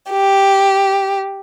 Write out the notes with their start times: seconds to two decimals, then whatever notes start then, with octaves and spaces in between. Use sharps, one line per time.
0.10 G4